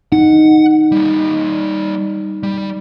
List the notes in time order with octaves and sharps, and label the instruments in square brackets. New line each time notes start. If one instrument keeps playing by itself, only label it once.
[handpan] D#4 [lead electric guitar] F#5
[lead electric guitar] G3 A#3
G3